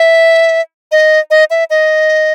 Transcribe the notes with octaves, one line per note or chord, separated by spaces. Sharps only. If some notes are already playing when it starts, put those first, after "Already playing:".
Already playing: E5
D#5
D#5
E5
D#5